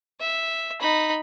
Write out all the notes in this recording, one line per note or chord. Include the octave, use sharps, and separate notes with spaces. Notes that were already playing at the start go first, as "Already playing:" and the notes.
E5
D#4 B5